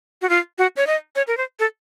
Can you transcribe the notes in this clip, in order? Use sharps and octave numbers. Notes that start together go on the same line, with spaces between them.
F#4
F4
F#4
C#5
D#5
C#5
A#4
C5
A4